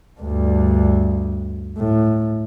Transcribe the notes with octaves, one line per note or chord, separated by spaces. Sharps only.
D2 G2
A2